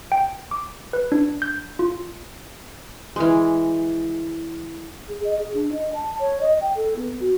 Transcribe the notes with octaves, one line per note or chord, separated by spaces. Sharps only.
G5
D6
B4
D4
G6
F4
E3 G#3
G#4
D#5
G#4
D4
D#5
A5
C#5
D#5
G5
A4
B3
F#4